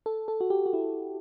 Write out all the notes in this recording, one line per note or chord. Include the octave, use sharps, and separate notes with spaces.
A4
A4
F#4
G4
F#4
E4